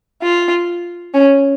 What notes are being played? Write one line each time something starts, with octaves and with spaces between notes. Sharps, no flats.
F4
C#4